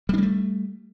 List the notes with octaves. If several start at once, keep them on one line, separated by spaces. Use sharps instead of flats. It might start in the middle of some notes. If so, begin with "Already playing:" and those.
G3 A3 A#3 D4